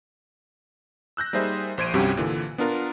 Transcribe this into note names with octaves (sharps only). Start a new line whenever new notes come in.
E6 F#6 G6 A#6
G3 A#3 D#4 G#4 C5 E5
A#1 C5 G#6 D7 D#7
C2 G2 C3 C#4 F#4 G4
A#2 D3 E3
B3 D4 F4 A#4